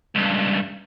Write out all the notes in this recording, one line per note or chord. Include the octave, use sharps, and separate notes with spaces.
C#2 G2